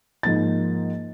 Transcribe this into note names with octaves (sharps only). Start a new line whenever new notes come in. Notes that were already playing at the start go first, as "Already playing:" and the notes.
G#2 F3 A#3 A6